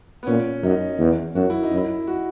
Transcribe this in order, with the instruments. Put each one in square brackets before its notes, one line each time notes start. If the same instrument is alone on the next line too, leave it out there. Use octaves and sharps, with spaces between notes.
[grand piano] B3
[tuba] A#2 [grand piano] C#4
[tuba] F#2 [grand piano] D#4
[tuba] E2
[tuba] F#2 [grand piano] F#4
[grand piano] E4
D#4
[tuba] F#2
[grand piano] E4
F#4